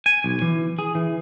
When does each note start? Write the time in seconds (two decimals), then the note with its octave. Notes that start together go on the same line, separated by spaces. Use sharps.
0.06 G#5
0.24 B1
0.42 E3
0.79 G#4
0.95 E3